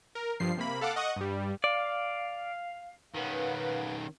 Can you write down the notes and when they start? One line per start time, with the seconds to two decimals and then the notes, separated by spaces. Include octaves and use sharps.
0.15 A#4
0.40 G2 F3 C7
0.57 C3 A#3 B5
0.81 A4 F5 F#5 D6
0.96 D#5 F#5 C#6 D#6
1.16 G2 G3
1.64 D5 F5
3.15 D#3 C#4 B4 F5 F#5